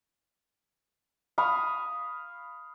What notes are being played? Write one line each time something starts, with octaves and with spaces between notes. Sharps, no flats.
F5 B5 C#6 D#6